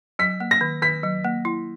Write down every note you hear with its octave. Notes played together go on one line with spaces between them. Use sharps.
F#3 B6
A#3
A#6
D#3
D#3 B6
F#3
A#3
E4